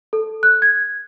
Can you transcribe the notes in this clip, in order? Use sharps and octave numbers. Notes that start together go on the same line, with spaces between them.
A4
F#6
G#6